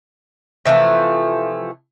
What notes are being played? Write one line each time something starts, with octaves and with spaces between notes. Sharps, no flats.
C3 E3 F3 A3